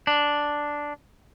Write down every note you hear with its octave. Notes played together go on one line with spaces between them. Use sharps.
D4